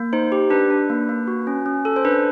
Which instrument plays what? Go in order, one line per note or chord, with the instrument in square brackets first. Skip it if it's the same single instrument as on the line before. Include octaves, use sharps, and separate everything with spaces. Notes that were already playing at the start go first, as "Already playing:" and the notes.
Already playing: [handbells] A#3
D#4 C5
G4
D4 B4
D4
A#3
A#3
F#4
C#4
C#4
A4
C5
D4 B4